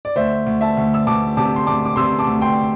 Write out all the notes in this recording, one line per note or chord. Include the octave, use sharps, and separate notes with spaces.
D5
D2 C5 E5
D2
E5 A5
D2
E6
D2 A5 D6
C3 A5 D6
C6
D2 A5 D6
D6
C3 C6 E6
A5 D6
D2
G5 C6